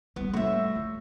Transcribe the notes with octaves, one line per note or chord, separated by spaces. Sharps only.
G3 A3 B3
A2 F#4 E5
F4